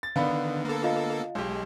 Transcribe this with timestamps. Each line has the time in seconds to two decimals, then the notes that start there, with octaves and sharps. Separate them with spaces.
0.03 A6
0.16 D3 D#3 B3 D5 F5 B5
0.65 A#3 A4
0.84 F4 D#5 F5
1.35 B1 G#3 G4